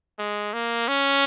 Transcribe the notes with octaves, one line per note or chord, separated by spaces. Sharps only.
G#3
A#3
C#4